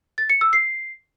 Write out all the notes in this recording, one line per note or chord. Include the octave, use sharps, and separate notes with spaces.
A6
C#7
E6
C7